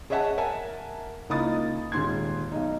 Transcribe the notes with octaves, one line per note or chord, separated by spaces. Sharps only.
G#4 C#5 D#5 E5 F#5 A5
A#4 E5 F#5 G#5 A5
C#2 A#3 D#4 E4 D#6 A6
D#1 G#2 C6 G#6
B1 D#4